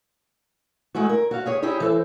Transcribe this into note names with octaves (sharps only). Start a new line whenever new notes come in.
G#3 A3 E4 F#4
A#4
F#4 F5
G4 G#4 C#5
D#4 E4 G4 G#4
E3 A4 C5